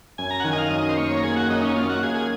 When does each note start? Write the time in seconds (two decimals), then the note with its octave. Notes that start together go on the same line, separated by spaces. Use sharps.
0.18 F#2 G#5
0.31 A#5
0.40 F#5
0.44 D#3 G#5
0.53 D#5
0.58 F5
0.70 F#2 D#5
0.89 C5
0.97 A#3 C#5
1.17 A#4
1.23 A#3 G#4
1.36 F#4
1.49 F#2 D#4
1.63 C#4
1.76 A#3 F4
1.89 F#4
2.03 F#2 G#4
2.15 G#4